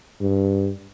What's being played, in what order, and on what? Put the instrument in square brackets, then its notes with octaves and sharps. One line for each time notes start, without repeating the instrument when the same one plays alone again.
[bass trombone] G2